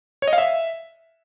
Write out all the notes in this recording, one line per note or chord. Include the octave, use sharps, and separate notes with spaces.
C#5
D#5
F5
E5